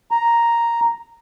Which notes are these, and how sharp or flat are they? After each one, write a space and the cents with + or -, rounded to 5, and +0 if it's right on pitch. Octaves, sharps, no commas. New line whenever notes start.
A#5 +0